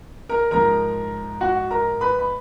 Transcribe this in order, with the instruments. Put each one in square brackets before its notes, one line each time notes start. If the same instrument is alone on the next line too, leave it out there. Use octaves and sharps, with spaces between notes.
[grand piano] A#4 A#5
G#2 F3 A#4 A#5
F#4 F#5
A#4 A#5
B4 B5
B5